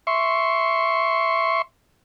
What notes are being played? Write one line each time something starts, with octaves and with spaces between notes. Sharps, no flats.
E5 C6 C#6